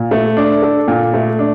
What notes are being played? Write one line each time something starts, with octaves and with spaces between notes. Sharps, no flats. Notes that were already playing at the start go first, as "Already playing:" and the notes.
Already playing: A#2
A3
D4
A4
A#2
A3
D4